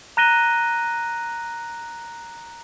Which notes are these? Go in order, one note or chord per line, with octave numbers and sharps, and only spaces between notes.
A#5 F#6 A#6 D#7 G7